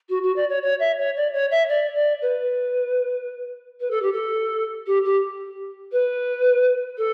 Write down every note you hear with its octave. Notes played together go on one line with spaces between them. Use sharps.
F#4
F#4
D5
C#5
C#5
E5
C#5
D5
C#5
E5
D5
D5
B4
B4
A4
G4
A4
G4
G4
B4
A4